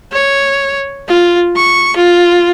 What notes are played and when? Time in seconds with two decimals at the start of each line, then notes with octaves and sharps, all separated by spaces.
0.12 C#5
1.08 F4
1.56 C#6
1.96 F4